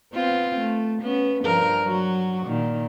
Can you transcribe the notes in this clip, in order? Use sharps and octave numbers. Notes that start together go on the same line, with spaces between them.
B3 C4 F4
A3
B3 C#4
G2 F3 A#4
F#3 F#4
A#2 D#3